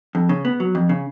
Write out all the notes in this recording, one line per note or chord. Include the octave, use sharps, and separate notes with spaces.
F2
C#3
B3
F#3
F2
C#3